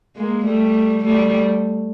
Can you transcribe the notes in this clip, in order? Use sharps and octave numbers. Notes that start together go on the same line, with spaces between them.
G#3 A#3
G3 A3
G3 A3